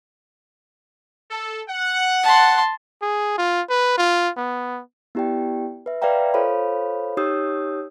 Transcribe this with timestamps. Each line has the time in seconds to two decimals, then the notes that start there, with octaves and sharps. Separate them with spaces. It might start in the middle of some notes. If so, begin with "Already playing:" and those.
1.31 A4
1.69 F#5
2.23 A5 C6
3.02 G#4
3.38 F4
3.69 B4
3.97 F4
4.37 B3
5.15 B3 E4 G4 D5 G5
5.86 B4 E5
6.02 B4 D5 E5 F5 G5 A#5
6.34 F4 A4 C5 C#5 F5 B5
7.17 D#4 G4 C#5 D#6 E6 G6